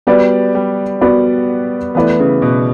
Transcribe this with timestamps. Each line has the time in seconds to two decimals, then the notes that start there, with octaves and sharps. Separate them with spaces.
0.07 G3 B3 F#4 B4 D5
0.55 G3
1.01 B3 F#4 B4 D5
1.95 E3 A3 B3 E4 B4 D5
2.20 C#3
2.42 B2